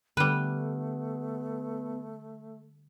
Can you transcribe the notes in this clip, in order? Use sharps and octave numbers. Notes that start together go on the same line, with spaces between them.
D3 G3 A3 B3 B4